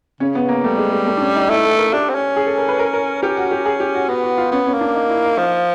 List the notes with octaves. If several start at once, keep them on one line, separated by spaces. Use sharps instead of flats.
C#3 C#4
B3
A#3
G3 A3
G#3
G#3
A3
D4
C#4
D#4
A3 E4
A4
A#4
D4 G4
C4
C#4
G#4
A4
A#4
B4
A#4
A#4
C#4 G4
F#4
G4
G#4
G4
F#4
B3 F#4
F#4
F4
B3 C#4
C#4
A#3
D4
D#4
E4
D#4
F3